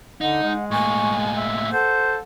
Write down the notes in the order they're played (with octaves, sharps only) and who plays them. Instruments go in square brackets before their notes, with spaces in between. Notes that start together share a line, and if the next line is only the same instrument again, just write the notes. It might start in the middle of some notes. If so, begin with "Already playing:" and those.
[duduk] D3 [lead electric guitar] D#4 [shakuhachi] F#5
[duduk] G#3
[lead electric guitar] A2 A#3 [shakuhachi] G#5 [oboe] C#6
[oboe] E5
[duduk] A4 [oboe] C5 [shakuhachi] F#5